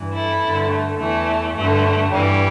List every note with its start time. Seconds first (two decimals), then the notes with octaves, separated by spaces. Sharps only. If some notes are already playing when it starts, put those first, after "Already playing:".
Already playing: G2 E3
0.14 E4 A4
0.43 G2 D3
0.71 A3
1.00 E2 E3 A3
1.56 G2 D3 A3
2.13 G2 E3 G3